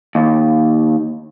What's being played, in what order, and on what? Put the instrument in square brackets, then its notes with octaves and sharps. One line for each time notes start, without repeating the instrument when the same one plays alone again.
[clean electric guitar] D#2